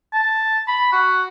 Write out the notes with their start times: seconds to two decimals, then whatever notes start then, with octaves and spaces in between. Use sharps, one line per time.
0.13 A5
0.68 B5
0.92 F#4